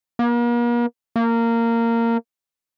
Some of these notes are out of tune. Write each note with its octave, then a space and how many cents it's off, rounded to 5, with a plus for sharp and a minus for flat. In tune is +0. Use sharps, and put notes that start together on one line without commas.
A#3 +40
A#3 -15